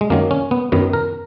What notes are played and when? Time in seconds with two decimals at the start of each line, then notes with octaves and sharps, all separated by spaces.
0.01 G#3
0.10 F#2 D#3 F#3 A#3
0.31 C#4
0.51 B3
0.72 F#2 D#3 F#3 B3
0.93 A#4